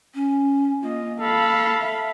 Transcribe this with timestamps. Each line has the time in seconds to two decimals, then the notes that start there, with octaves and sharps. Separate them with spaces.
0.15 C#4
0.82 A#3 F4 D#5
1.20 A4 F5 B5
1.80 E5